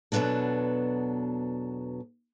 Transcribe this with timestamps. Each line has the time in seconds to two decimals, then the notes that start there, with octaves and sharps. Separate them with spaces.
0.12 E2 B2 F#3 B3 D4 A4